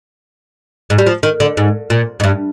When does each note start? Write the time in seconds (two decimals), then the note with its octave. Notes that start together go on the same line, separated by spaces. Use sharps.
0.90 G#2
0.98 G3
1.06 F3
1.23 D#3
1.40 D3
1.57 G#2
1.90 A#2
2.20 G#2
2.24 G2